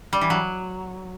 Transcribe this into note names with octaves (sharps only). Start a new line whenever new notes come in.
G3
E3
F#3